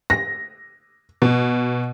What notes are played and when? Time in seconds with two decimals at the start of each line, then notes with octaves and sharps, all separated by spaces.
0.10 A#6
1.22 B2